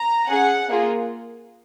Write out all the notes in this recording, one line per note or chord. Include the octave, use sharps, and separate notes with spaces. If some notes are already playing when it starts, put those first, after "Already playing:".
Already playing: A#5
C#4 G#4 F#5
A#3 F4 G#4